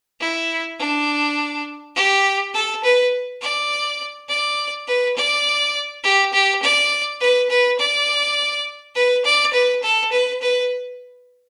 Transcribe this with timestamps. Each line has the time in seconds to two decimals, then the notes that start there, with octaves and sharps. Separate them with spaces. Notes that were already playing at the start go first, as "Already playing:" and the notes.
0.20 E4
0.79 D4
1.96 G4
2.54 A4
2.84 B4
3.42 D5
4.29 D5
4.87 B4
5.16 D5
6.04 G4
6.33 G4
6.62 D5
7.21 B4
7.50 B4
7.79 D5
8.95 B4
9.25 D5
9.54 B4
9.83 A4
10.12 B4
10.42 B4